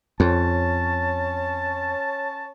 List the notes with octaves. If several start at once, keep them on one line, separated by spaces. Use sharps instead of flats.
F2 C#4 C#5 A5